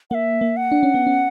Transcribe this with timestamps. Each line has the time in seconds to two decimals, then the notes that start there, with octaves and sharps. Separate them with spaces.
0.10 A#3 E5 F#5
0.41 A#3
0.57 F#5
0.72 D4
0.83 C#4
0.94 B3
1.07 C#4